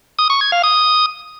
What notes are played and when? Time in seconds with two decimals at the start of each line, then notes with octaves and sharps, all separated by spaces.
0.19 D#6
0.30 C#6
0.41 G#6
0.52 F5
0.63 D#6